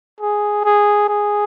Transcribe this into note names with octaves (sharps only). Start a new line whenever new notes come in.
G#4
G#4
G#4